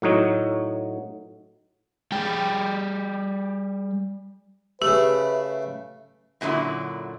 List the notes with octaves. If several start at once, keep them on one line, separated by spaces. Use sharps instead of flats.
A2 F#3 D#4 C#5
G3 G#4 G5
C#3 A3 G4 B4 E5
F#2 A#2 D3 F#3 E4